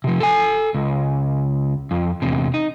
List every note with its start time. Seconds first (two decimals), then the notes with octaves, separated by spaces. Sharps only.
0.04 C3 F3
0.20 A4 G#5
0.74 C#2
1.91 F2
2.22 E2 C3
2.54 D#4